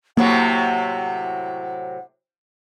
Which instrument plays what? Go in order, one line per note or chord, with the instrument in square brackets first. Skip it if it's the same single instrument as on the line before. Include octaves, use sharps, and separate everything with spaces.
[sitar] A2 C3 F#3 [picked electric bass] A#3 [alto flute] F#5